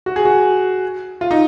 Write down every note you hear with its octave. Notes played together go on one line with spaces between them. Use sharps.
F#4
G#4
F#4
F4
D#4